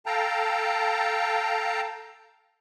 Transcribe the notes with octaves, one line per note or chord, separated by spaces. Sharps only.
A4 F5 G5 A5 A#5